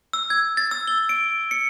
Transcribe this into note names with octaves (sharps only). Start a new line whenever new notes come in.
E6
G#6
A6
E6
G7
D7
C#7